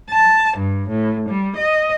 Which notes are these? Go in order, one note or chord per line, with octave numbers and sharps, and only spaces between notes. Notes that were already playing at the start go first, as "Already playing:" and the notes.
A5
G2
A2
G3
D#5